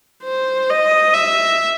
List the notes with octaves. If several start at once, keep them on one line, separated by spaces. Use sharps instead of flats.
C5
D#5
E5